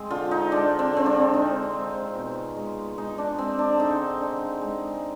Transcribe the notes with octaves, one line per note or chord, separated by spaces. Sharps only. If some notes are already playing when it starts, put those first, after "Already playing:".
Already playing: G#3 C4
D3 F4
D#4
G#3 D4
C4
D3 C4
D4
G#3 D#4
G#3
B2
G#3
G#3 D#4
D4
G#3 C4
D4
D3 D#4
D3
G#3